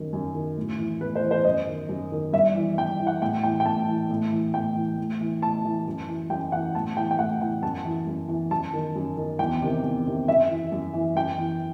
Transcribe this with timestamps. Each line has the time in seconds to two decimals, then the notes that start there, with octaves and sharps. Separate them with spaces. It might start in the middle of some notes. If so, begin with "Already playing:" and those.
Already playing: F#2 D#3
0.13 F#2
0.35 D#3
0.57 A2
0.79 E3
1.01 A2 B4
1.15 C5
1.23 E3
1.31 C5
1.45 F#2 D#5
1.67 D#3
1.89 F#2
2.12 D#3
2.33 G2 E5
2.55 E3
2.78 G2 G5
2.99 E3
3.07 F#5
3.21 A2 G5
3.43 E3 G5
3.60 G5
3.65 A2 A5
3.88 E3
4.10 A2
4.32 E3
4.54 A2 G5
4.76 E3
4.98 A2
5.21 E3
5.42 A2 A5
5.65 E3
5.87 F#2
6.08 E3
6.30 F#2 G5
6.52 E3 F#5
6.75 A2 A5
6.96 E3 G5
7.11 G5
7.19 A2 F#5
7.41 E3 G5
7.62 F#2 A5
7.85 E3
8.07 F#2
8.29 E3
8.51 F#2 A5
8.73 D#3
8.95 F#2
9.17 D#3
9.39 E2 G5
9.62 C3 D#3
9.84 E2
10.06 C3 D#3
10.28 F#2 E5
10.49 E3
10.72 F#2
10.93 E3
11.15 F#2 G5
11.38 E3